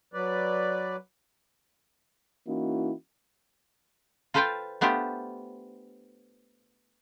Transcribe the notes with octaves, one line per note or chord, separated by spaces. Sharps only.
F#3 B4 D5
E3 A#3 C#4 D#4 E4 F#4
F4 A4 B4 C5 F5 G5
A3 B3 D4 F4 G4 C5